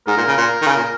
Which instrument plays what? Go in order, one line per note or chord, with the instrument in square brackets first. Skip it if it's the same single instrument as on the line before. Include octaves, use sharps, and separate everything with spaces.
[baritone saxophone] G#2 [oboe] A#4
[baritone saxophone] A#2
C#3
A#2
D#3
C#3
A#2